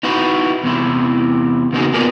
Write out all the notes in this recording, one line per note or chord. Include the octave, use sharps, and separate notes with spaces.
D#4 E4 F#4 B4
E2 C3 E4
C#3 A#3 B3 D#4 F#4 G#4
B3 D4 F4 G#4 A#4 B4